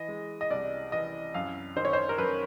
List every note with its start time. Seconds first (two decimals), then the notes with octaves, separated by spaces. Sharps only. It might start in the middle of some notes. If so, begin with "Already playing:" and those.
Already playing: E3 D#5
0.09 G#3
0.41 D#5
0.50 C2 D5
0.92 E3 D#5
1.34 F#2 F5
1.76 D#3 C5
1.85 C#5
1.93 C5
2.09 A#4
2.18 F#2 B4